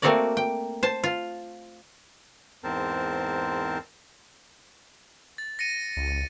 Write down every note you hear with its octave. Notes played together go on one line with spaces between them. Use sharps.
A3 A#3 C4 F#4 A#4 D5
G5
C5 A5
F4
E2 G#2 C4 A#4 C5 A5
A6
A#6 C#7 D#7
C#2